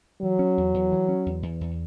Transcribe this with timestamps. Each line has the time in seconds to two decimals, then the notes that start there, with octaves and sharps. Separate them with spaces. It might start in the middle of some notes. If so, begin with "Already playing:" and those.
0.22 E3 F#3
0.39 C#4
0.57 E2
0.74 E2
0.92 E3
1.08 C#4
1.26 E2
1.43 E2
1.61 E2